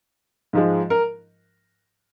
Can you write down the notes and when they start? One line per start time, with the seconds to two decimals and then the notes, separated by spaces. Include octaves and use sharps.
0.53 G#2 F3 G#3
0.90 A#4